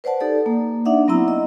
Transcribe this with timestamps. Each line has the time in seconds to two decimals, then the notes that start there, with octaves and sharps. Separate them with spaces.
0.04 B4 C5 D5 F#5 A5
0.20 D#4 G4 A4 D5
0.46 A#3
0.85 D4 D#4 D5 E5 F#5
1.08 F#3 B3 C4 E4 A#5 E6
1.28 D#5